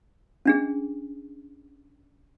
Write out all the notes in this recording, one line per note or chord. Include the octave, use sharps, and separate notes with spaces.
C#4 D4 G#4